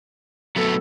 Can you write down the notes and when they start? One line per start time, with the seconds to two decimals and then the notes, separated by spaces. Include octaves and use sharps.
0.56 F#3 A3 B3 A4